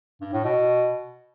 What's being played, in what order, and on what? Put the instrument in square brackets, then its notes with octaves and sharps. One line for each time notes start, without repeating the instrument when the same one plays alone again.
[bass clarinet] G2
A2
B2